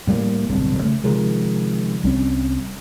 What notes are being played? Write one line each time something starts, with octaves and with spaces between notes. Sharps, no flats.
A2 G3 A#3
D1 B1 G2 C3
C#3 A3
C3 D#3 F3 G#3
C2 G3 C4 C#4